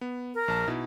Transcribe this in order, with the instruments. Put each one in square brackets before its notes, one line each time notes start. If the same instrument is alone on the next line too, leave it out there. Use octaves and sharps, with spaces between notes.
[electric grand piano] B3
[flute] A#4
[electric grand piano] A#1 A5
B2 D#4 E4